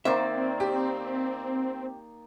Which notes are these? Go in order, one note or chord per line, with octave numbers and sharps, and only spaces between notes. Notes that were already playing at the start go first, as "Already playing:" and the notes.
D#3 A#3 C4 C5 D5 E5
G4